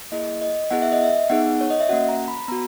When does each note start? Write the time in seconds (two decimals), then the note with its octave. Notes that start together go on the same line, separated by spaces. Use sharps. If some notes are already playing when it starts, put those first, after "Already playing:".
0.12 A#3 E4 G#4 D#5
0.41 D#5
0.71 B3 E4 G#4 F#5
0.82 E5
0.92 D#5
1.03 E5
1.30 B3 D#4 G#4 F#5
1.61 C#5
1.70 D#5
1.80 E5
1.89 A#3 C#4 F#4 F#5
2.09 A#5
2.28 B5
2.48 B3 F#4 A#5